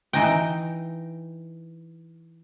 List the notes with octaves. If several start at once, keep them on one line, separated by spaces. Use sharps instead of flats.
E3 D#4 G5